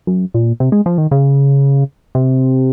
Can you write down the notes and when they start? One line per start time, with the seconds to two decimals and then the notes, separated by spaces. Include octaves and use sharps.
0.07 F#2
0.34 A#2
0.60 C3
0.72 G#3
0.86 F3
0.98 D#3
1.11 C#3
2.15 C3